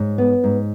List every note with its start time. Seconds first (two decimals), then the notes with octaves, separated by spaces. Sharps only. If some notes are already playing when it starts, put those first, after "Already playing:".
Already playing: G#2 C#5
0.18 B3
0.44 G#2